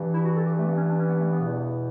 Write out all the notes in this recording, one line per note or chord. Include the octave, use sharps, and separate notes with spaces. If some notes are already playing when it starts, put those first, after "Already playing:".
Already playing: G2 E3
E4
F#4
A4
G4
A3
B3
C#4
D4
C#4
B3
A3
B3
E2 B2